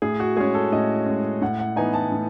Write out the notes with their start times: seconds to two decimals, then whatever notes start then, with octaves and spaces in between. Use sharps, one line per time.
0.02 A2 G#4
0.20 F#4
0.37 G#3 C#4 G#4
0.54 A4
0.72 A2 D#5
1.06 G#3 C#4
1.41 A2 F#5
1.59 F#5
1.76 E3 B3 D#4 G#5
1.94 A5
2.12 A2